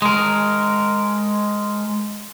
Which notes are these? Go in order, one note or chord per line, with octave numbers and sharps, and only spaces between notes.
G#3 A#4